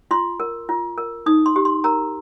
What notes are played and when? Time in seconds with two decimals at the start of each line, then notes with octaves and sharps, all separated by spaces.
0.11 F4 C6
0.40 A#4
0.69 F4
0.98 A#4
1.26 D#4 D#6
1.46 C6
1.56 G4
1.65 C6
1.84 A#4 A#5